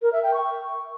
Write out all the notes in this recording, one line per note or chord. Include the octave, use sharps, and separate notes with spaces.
A#4
E5
G5
C#6